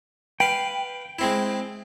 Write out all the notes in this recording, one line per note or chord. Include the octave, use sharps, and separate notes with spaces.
B4 F5 G5
G#3 C4 E4